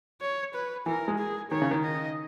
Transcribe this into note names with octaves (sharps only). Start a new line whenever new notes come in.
C#5
B4
E3 A#4
G#3
G#4
D#3 C#5
C#3
D#3
D#5